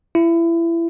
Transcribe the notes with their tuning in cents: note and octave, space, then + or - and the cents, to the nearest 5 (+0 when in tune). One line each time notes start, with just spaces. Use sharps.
E4 +25